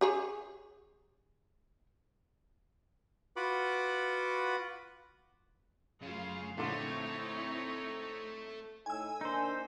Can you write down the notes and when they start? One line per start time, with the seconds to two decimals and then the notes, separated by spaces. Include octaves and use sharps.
0.01 G4 G#4 C#5
3.36 F4 F#4 B4 F#5 B5 D6
6.02 F#2 C#3 A3 F4 F5
6.57 A#1 D3 A3 C4 D#4 E4 C#5 C6
8.86 A2 D#4 A4 G#5 E6
9.21 D#3 A#3 D4 D#4 C5